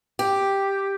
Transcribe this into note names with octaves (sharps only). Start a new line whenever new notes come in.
G4